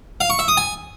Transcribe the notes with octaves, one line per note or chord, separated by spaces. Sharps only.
F5
C#6
E5
D#6
G#5